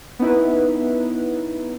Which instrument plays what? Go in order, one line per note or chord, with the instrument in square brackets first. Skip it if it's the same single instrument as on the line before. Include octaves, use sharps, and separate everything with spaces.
[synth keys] B3 C#4 D#4 E4 B4